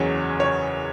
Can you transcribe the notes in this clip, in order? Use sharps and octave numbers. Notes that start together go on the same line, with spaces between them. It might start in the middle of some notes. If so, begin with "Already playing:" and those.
Already playing: F#1 E2 C#3 F#3 C#5
C#5